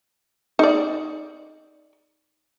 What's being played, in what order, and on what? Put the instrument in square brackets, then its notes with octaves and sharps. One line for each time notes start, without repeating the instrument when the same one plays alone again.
[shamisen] D#4 D5